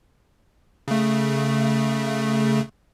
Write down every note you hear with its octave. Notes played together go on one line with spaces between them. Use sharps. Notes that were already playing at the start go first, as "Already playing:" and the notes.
C#3 A3